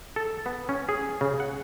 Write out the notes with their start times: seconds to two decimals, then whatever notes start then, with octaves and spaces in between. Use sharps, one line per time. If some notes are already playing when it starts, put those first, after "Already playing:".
0.16 A4
0.46 B3
0.69 C#4
0.89 G#4
1.21 C#3
1.40 F#5